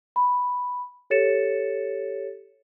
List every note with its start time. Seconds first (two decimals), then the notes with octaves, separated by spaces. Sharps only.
0.16 B5
1.10 G4 A4 C#5 A6 C#7 E7